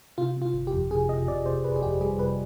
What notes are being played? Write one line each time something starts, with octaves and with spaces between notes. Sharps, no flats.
C3 F4
C3
F4
G1
G4
F2
C3 G#4
C3 D#5
C3 D5
C3 C5
G1 B4
G#4
F2 G4
G3 G#4
C3 B4